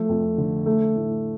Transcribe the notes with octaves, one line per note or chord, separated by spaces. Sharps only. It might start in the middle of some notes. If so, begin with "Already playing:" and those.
Already playing: F3 A3
F2
D3
A3
A2